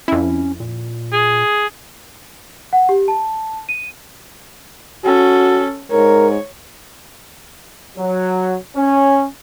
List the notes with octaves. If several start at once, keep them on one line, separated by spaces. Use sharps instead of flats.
F2 C#4 E4
A#2
G#4
F#5
G4
A5
D#7
C#4 F#4 A4
G#2 A#4 C#5
F#3
C#4